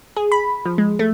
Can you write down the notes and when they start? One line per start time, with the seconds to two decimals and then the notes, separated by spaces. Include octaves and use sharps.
0.17 G#4
0.32 B5
0.66 F3
0.78 G#3
0.99 A3